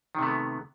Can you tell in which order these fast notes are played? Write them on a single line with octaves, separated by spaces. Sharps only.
D#3 C3 A3 B3